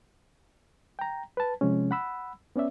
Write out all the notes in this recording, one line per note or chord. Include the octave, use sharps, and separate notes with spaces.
G5 A#5
B4 A5
C3 F3 G#3 C#4
F#5 B5 E6
B3 C#4 D5 E5